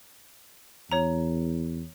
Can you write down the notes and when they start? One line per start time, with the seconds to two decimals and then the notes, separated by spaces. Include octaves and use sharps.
0.91 E2 C#5 A#5